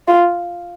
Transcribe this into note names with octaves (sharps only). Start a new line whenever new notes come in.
F4